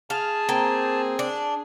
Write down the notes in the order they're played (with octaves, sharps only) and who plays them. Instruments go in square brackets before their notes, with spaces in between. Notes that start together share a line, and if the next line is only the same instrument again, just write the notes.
[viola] G#4 [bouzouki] F5 [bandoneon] A5
[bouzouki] A#3 G5 [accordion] C4
[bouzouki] D4